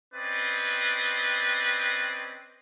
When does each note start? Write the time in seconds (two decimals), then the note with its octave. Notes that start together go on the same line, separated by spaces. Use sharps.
0.14 C4 C#4 B4 D5 D#5